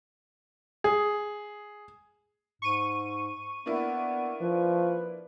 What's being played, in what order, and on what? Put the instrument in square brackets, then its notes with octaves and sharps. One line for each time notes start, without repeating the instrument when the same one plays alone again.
[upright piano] G#4
[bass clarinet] G#2 [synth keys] C#6 D#7
[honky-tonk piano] A#3 D4 E4 [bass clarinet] B3
[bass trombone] F3 [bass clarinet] B4